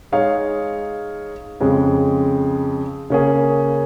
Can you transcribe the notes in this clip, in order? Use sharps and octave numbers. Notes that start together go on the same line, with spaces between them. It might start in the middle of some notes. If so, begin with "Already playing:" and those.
G#3 D#4 C#5 F5
F2 C#3 G#3
C#3 A#3 C#4 G#4